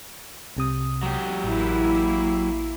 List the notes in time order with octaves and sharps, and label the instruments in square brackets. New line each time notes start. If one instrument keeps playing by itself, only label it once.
[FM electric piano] C2 C3 D#6
[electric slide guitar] F#3 G4
[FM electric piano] A1 [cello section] A#3 E4